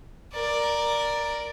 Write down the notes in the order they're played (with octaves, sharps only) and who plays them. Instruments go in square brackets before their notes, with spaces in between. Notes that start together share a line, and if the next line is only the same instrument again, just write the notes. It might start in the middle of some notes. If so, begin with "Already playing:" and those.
[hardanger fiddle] A#4 D5